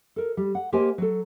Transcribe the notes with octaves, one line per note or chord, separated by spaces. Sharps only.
A4 A#4
G3
F#5
A#3 G4 A#4 C5 D#5 G#5
F#3 A4